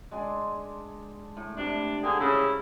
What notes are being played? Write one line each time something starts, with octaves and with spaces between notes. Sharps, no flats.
G#3 D4 G#5
A2
C3 G3 D4
D3 G#4 G5 A#5
C#3 E4 G#4